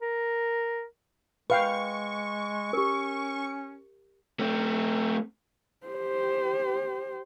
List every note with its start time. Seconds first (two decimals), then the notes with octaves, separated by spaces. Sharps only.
0.02 A#4
1.50 G#3 B4 F5 G5 C#6
2.73 C#4 G4 A#4
4.40 A3 C4
5.86 G4 C5